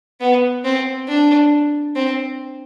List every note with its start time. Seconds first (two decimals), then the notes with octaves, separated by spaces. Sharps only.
0.21 B3
0.65 C4
1.08 D4
1.96 C4